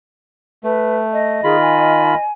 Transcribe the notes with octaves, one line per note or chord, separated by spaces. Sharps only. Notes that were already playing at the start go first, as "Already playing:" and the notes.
A3 B4
D#5
D#3 F4 G#4 B5
G#5